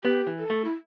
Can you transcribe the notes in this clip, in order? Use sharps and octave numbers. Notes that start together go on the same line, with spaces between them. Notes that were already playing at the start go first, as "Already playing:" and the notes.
B3 G4
E3
A4
A3
E4